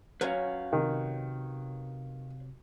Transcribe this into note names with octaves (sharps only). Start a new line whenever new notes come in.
F#3 C#4 B4 C#5 F5
C3 D#3